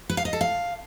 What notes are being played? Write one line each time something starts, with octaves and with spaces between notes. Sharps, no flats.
B4
F5
D#5
A4
F5